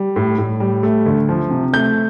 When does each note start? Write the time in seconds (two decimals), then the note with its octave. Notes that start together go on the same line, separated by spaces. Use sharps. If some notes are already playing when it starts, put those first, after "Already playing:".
Already playing: G3
0.16 A2
0.38 A2
0.60 G3
0.83 A3
1.06 D2
1.29 F3
1.50 C3
1.73 A3 G6